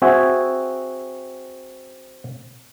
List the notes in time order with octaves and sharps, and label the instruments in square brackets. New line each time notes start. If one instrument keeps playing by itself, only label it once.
[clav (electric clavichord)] C4 F#4 G#4 E5 G5 G#5